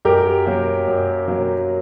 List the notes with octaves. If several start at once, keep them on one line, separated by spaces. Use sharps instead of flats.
F#2 G4 A#4
F#3 A#3
F#2
F#3 A#3